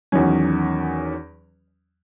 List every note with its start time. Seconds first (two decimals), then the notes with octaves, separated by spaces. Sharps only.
0.12 E2 D#3 F#3 C#4